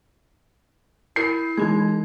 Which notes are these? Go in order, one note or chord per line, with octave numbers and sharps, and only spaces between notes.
E4 A#4 G6 C7
E3 G#3 D#4 G#6